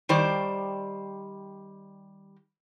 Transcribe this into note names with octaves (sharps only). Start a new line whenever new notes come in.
D#3 G3 C5 D5